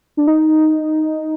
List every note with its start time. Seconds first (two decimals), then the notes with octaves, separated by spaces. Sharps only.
0.17 D4
0.27 D#4